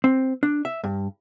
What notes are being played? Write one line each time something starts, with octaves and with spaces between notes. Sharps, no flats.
C4
D4
E5
G2